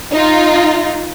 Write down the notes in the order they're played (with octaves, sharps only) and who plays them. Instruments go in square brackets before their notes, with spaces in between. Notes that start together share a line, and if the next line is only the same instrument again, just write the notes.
[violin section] D#4 F4